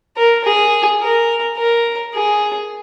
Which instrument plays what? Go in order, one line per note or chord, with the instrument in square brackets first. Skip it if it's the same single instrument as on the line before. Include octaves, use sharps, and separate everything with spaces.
[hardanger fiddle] A#4
G#4
A#4
A#4
G#4